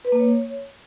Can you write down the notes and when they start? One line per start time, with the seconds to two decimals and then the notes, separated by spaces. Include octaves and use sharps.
0.05 B4
0.12 A#3
0.20 C#5